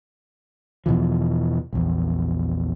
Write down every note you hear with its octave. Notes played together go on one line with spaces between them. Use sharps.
E2 B2 E3 F3
A#1 E2